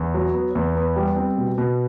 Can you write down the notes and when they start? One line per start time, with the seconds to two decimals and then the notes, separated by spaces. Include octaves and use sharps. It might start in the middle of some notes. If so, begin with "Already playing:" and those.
Already playing: E2
0.14 F#3
0.34 B3
0.55 E2
0.75 B3
0.96 G3
1.16 C4
1.37 B2
1.58 B2